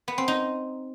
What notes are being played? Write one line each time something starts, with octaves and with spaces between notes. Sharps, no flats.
B3
C4
D#4